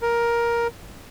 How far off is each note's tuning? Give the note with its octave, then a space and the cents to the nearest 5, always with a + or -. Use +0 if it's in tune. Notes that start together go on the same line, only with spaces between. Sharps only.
A#4 +10